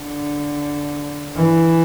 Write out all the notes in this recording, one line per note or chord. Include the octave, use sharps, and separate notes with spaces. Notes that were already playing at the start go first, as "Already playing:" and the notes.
Already playing: D3
E3